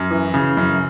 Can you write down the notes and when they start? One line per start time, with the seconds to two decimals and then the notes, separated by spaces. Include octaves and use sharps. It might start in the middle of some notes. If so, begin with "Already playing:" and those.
Already playing: F#2
0.11 E3
0.34 C#3
0.57 F#2